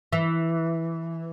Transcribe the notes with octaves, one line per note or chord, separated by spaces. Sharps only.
E3